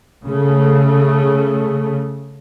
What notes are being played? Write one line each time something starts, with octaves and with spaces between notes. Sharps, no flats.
C#3 A3